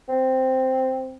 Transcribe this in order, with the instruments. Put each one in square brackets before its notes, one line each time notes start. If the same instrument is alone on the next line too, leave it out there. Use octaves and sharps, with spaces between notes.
[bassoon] C4